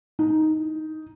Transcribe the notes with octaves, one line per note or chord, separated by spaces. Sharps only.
D#4